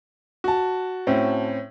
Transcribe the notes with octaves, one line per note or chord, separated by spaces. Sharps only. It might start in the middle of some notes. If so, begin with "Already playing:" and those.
F#4 A5
A2 C4 C#4